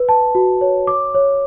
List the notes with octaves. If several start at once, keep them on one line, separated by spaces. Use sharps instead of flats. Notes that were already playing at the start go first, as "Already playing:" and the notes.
Already playing: B4
A5
F#4
C#5
D6
C#5